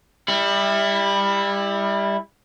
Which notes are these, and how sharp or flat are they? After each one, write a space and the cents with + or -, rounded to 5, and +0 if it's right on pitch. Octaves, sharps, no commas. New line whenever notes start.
G3 +25 E4 -5